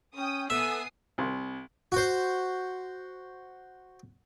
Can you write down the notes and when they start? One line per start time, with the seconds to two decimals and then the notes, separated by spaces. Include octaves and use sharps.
0.15 C#4 G5 D#6
0.50 B3 A4 E5 G#5 D#6 C7
1.18 C2
1.92 F#4 C5